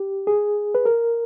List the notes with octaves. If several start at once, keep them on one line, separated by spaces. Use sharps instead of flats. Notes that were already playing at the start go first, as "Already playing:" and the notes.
Already playing: G4
G#4
B4
A#4